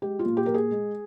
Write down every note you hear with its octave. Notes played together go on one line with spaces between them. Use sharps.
G#3 G4
F4
A#2
G4
A#2 A#4
G#4
G#3